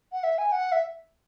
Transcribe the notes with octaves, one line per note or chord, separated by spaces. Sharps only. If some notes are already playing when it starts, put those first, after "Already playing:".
F#5
E5
G#5
F#5
E5